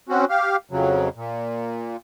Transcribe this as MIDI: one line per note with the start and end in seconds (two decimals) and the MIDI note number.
0.09 0.25 60
0.09 0.25 61
0.09 0.25 66
0.30 0.56 67
0.30 0.56 77
0.71 1.09 41
0.71 1.09 49
0.71 1.09 54
1.16 1.97 46